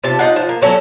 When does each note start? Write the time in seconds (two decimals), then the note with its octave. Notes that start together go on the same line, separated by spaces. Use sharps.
0.04 C3 F4 A5
0.19 D#4 F4 F#5
0.36 F3
0.49 A#3
0.61 F3 F#3 A3 C#4